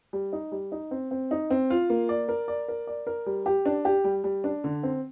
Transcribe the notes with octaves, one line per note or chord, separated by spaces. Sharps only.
G3
D#4
G3
D#4
C4
C4
D#4
C4
F4
A#3
D5
A#4
D5
A#4
D5
A#4
G3
G4
D4
G4
G3
G3
D4
D3
C4